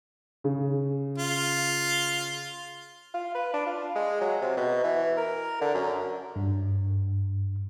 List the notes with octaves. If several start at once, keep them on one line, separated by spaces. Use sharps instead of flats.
C#3
F4
F4
B4
D4
F4
G#3
F#3
C3
B2
E3
A#4
D3
F#2
G2